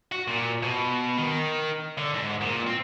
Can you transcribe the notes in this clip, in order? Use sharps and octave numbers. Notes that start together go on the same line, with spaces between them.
F#4
A#2
B2
D#3
D3
G#2
A#2
C4